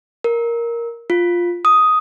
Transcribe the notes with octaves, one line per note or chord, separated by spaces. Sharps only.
A#4
F4
D#6